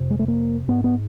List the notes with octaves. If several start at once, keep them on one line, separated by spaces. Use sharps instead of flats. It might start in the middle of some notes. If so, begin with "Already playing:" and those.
Already playing: F2 C3
G#3
A3
A#3
G#2 B3
B3